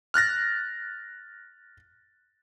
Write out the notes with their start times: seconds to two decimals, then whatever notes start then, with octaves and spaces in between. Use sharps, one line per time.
0.14 F6 F#6 A6 A#6